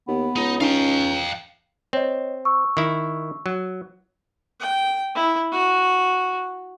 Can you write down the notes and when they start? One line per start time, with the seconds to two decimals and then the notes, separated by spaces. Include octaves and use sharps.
0.08 D#2 B3
0.36 C#2 D#4
0.61 C#4 D#4 F5 G5
1.93 C4 C#5 D#5
2.45 C#6 E6
2.77 D#3 E4
3.46 F#3
4.60 G5
5.15 E4
5.52 F#4